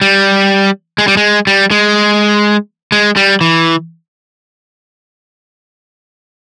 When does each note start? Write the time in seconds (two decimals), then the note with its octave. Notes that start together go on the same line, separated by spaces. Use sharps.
0.01 G3
0.98 G#3
1.08 G3
1.17 G#3
1.47 G3
1.71 G#3
2.92 G#3
3.16 G3
3.41 E3